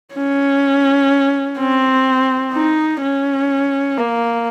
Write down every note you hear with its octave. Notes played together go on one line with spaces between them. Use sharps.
C#4
C4
D#4
C#4
A#3